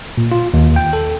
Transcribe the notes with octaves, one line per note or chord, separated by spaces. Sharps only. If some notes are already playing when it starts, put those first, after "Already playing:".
A#2
F4
D#2
G5
A4